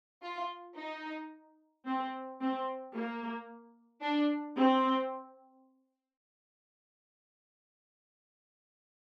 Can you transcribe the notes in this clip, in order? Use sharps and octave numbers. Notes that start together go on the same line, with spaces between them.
F4
D#4
C4
C4
A#3
D4
C4